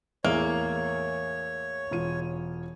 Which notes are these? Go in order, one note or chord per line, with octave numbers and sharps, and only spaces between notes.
E2 A2 A#3 G#4 C#5 E5
E1 F4 D#7